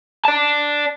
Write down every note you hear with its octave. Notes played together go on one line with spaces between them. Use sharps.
D5 A5